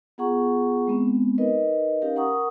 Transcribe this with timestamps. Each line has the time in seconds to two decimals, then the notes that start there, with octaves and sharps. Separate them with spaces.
0.18 B3 F4 G#4 F#5 A#5 C#6
0.87 G#3 B3 C4
1.38 D#4 A#4 B4 D#5
2.02 C#4 D#4 G4 A#4 F5
2.16 A#4 F#5 A#5 C#6 D#6